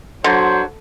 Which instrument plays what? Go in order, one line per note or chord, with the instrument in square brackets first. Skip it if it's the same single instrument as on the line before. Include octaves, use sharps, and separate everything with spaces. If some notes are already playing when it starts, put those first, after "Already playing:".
[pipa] D3 [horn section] F#3 C5